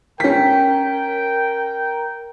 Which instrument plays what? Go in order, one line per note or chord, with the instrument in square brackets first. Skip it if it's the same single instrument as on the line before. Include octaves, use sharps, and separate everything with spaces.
[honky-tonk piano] C#4 B6 [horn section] A#4 G5